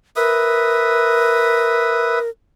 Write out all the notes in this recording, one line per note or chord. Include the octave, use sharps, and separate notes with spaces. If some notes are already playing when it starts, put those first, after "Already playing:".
A#4 B4 E5 D#6